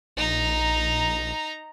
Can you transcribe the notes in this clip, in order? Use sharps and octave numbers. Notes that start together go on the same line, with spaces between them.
A#1 D#4 A#5